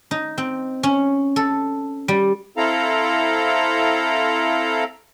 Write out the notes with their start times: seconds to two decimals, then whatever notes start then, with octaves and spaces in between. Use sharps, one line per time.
0.11 D#4
0.38 C4
0.83 C#4
1.36 A4
2.08 G3
2.57 C4 E4 A4 F5 A#5